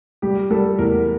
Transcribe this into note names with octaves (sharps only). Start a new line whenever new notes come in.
G3 G4
G3 A4
E2 A#4